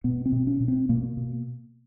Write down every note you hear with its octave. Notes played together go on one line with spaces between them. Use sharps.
B2 B3
C4
B2
C#4
B2
C4
B2 A#3
B2